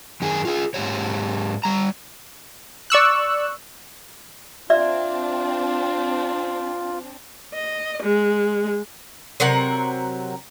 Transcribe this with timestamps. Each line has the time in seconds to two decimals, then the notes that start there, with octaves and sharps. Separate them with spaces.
0.22 F#2 D#3 G#4 G#5
0.45 F4 G#4
0.74 G#2 B2 G4 C#5
1.64 G3 A#5
2.90 D5 C#6 E6 F#6
4.70 C4 D4 F4 D5 E5
7.54 D#5
8.02 G#3
9.40 C3 F#3 A#4 F#5